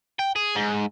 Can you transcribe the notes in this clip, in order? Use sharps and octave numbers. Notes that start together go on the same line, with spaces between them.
G5
G#4
G#2